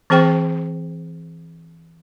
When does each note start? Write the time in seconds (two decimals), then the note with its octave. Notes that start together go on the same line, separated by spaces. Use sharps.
0.10 E3 C4 G#4 C5 G5 C#6